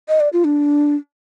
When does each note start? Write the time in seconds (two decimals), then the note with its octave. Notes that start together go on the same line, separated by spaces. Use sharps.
0.08 D#5
0.20 D5
0.33 F4
0.44 D4